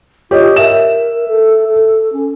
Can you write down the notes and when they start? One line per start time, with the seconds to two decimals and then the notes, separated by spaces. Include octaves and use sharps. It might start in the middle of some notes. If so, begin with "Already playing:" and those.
0.31 F4 G4 C#5 D#5
0.56 A#4 E5 E7
1.28 A4
1.69 A4
2.13 C#4